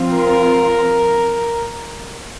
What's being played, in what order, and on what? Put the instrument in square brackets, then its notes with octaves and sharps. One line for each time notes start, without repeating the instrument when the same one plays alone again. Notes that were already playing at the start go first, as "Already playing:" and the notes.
Already playing: [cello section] F3 C4 F4
[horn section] A#4